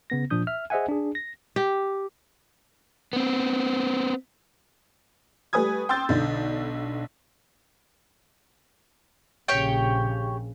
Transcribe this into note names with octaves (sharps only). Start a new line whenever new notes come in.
C#3 B3 A#6
A#2 F3 D4 D#6 G6
E5 F6
G#4 C5 D#5 E5 F#5 G#5
D4 G#4
A#6
G4
B3 C4
G3 A3 B4 G#5 D#6 G#6
G5 C6 E6 G6 A6
B1 D3
A#1 C#3 G4 C#5 G5